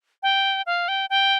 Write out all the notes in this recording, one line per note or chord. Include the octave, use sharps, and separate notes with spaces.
G5
F5
G5
G5